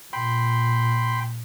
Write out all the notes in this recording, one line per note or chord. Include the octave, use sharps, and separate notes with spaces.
A#2 G5 B5 C6